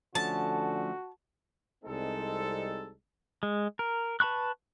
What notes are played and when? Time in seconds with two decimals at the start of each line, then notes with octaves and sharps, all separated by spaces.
0.15 D3 F3 A3 C#4 F#4 A5
1.84 C2 G3 G#3 C4 D#4 A4
3.43 G#3
3.79 A#4
4.20 B4 A5 B5 C#6 F#6